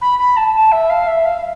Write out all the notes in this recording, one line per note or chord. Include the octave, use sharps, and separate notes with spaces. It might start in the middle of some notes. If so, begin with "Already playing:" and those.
B5
B5
A5
A5
E5
F5
E5
F5